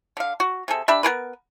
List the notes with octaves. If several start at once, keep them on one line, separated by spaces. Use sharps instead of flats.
D3 F5
F#4
C3 G#4 A4
D4 G4 E5 B5
B3 G#4 A#4 B4